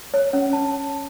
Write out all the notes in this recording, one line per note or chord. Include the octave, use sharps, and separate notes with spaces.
C#5
C#4
A5